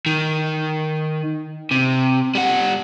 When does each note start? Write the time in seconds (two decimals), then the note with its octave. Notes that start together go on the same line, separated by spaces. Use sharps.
0.06 D#3
1.71 C3
2.35 G3 F#5